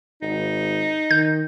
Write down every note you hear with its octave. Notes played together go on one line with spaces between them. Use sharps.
G#1 D#4
D#3 G6